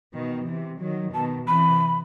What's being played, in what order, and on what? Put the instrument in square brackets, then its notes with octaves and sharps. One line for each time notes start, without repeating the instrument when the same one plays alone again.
[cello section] B2 D#3
C3 E3
D#3 F#3
[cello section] B2 D#3 [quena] A5
[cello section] C3 E3 [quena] B5